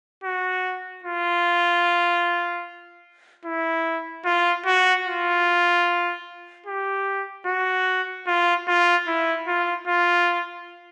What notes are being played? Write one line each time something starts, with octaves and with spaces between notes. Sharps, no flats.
F#4
F4
E4
F4
F#4
F4
G4
F#4
F4
F4
E4
F4
F4